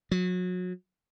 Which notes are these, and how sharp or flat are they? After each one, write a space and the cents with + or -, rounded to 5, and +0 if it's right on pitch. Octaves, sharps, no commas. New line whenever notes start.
F#3 -30